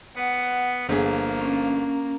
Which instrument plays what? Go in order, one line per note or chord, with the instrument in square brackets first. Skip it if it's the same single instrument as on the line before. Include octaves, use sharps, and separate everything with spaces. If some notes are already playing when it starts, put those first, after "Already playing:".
[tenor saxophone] B3 [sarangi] F#5
[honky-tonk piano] G1 G#4 [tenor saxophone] F3 [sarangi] A#3
[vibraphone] C#4